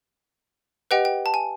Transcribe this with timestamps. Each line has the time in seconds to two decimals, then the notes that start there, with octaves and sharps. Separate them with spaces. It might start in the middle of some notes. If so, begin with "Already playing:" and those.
0.91 G4 B4 D#5 F#5 G5
1.05 G5
1.26 A5
1.34 G#5